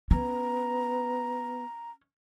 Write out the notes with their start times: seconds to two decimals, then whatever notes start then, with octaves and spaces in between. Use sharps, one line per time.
0.11 B3 C#4 A#5